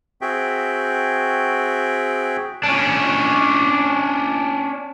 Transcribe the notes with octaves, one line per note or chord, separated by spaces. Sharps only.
C4 F#4 G#4 E5 G5
C#4 D4